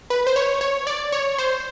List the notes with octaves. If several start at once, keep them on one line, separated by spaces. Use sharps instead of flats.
B4
C5
C#5
C#5
D5
C#5
C5